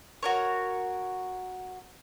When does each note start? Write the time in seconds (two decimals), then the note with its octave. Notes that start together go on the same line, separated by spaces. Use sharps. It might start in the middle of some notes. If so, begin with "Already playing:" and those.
0.23 F#4 A#4 C#5